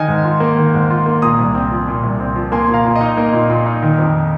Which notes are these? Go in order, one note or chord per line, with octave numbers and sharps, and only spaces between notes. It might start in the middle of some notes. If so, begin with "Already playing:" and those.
Already playing: D#3 D#5 G#5
G#2
F4
A#3
D#3
G#2
F4
A#3
A#2 A#5 D#6
C2
C4
F3
A#2
C2
C4
F3
A#3 G#5 C6
A#2 C6
F5 A#5
A#2
D#5
D#4
A#3 D#5
A#2
A#2
D#4
D#3
F2